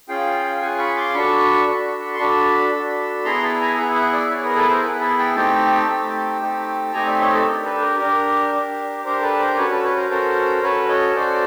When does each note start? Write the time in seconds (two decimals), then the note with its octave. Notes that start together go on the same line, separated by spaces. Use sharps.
0.09 C#4 F4 G#4 F5 G5
0.61 C#4 F4 G#4 F#5 G#5
0.79 B5 C#6
0.97 C6 D6
1.14 D4 F#4 A4 B5 C#6
1.67 D4 F#4 A4
2.14 C6
2.19 D4 F#4 A4 A5 B5
2.73 D4 F#4 A4
3.25 B3 E4 G#4 A#5 C6
3.43 A5 B5
3.60 G#5 A#5
3.77 B3 E4 G#4 E5 F#5
3.95 E5 F#5
4.13 D5 E5
4.30 B3 E4 G#4 B4 C#5
4.44 A#4
4.56 A4 B4
4.70 A#4 C5
4.83 B3 E4 G#4 E5 F#5
5.01 A5 B5
5.18 G5 A5
5.36 A3 C4 D#4 G4 G5 A5
5.88 A3 C4 D#4 G4
6.41 A3 C4 D#4 G4
6.93 A3 C4 D#4 G4 G#5 A#5
7.07 D5 E5
7.20 C#5 D#5
7.34 A4
7.47 D4 G4 A#4
7.64 A4 B4
7.81 A#4
7.99 D4 G4 A#4
8.52 D4 G4
9.04 D4 G4 A#4 C5
9.22 A4 B4
9.39 A#4 C5
9.57 C#4 F#4 A4 B4 C#5
9.70 A4 B4
9.84 B4 C#5
9.97 A#4 C5
10.10 C#4 F#4 A4 A#4 C5
10.62 C#4 F#4 A4 B4 C#5
10.89 C#5 D#5
11.15 C#4 F#4 A4 C5 D5